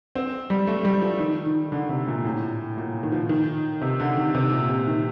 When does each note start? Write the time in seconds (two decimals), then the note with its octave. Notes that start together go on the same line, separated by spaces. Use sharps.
0.15 C4
0.50 G3
0.67 A3
0.85 G3
1.02 F3
1.19 D#3
1.46 D#3
1.72 D3
1.89 C3
2.08 A#2
2.25 A2
2.77 A#2
3.03 D#3
3.12 F3
3.29 D#3
3.81 C3
4.00 D3
4.17 D#3
4.35 C3
4.52 A#2
4.69 C3
4.87 D#3